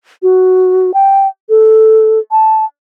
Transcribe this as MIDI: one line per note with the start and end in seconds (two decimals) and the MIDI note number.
0.23 0.93 66
0.94 1.28 79
1.49 2.19 69
2.31 2.65 81